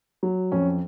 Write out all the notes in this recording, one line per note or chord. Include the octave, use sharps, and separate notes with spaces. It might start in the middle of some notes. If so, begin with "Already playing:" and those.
F#3
F2 C#4